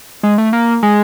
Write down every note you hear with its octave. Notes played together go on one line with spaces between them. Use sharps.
G#3
A3
A#3
G#3